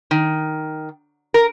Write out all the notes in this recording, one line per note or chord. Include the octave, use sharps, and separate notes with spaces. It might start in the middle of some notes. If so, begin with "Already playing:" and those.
D#3
A#4